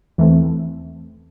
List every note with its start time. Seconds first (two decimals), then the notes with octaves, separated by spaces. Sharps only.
0.18 E2 E3 A3 C4